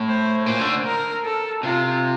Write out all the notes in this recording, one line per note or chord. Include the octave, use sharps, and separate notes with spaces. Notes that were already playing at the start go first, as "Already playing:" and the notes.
Already playing: A2
C5
A#2 C5
D3
A#4
A4
C3 F4